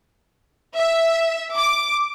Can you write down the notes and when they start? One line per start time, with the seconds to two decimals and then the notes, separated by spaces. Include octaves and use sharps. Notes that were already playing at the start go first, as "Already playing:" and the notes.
0.77 E5
1.56 D6